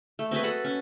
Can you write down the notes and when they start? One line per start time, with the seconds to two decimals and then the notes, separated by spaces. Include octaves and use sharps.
0.19 A3
0.31 C4 F#4 G#4 B4
0.43 A4 F#5 B5
0.65 C#4